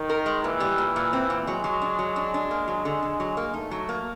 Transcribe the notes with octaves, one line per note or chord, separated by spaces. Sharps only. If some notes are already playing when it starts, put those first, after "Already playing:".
Already playing: D#3
A#4
G#3
A#2 E3
G3
A#2
A#2
C4
A#2
F#3 G#3
F#3
D4
F#3
D4
D4
A#3
F#3
D3
D3
F#3
A#3
A3 D#4
F#3
A#3